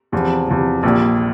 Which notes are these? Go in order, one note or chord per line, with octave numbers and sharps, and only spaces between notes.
E2 C3 F3
E2 C3 F3
A#1 A#2 G3